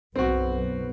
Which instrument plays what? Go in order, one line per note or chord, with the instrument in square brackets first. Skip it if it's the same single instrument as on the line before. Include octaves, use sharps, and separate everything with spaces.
[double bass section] B1 F#2 B3 [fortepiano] C4 F#4